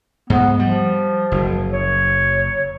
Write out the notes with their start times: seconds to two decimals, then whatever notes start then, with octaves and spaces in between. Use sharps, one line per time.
0.30 G#2 B3
0.59 F3 G3
1.32 F#1
1.72 C#5